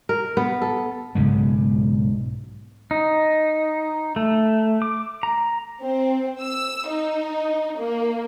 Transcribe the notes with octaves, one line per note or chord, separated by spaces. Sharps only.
A#4
B3
A4
B1 G#2 C#3 G#3
D#4
A3
D6
A#5
C4
E6
D#4
A#3